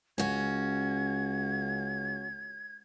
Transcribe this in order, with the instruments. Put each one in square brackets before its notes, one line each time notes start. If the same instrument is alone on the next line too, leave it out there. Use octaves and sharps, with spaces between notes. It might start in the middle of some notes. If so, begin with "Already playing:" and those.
[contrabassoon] C#2 [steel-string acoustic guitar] C#4 F#4 [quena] G#6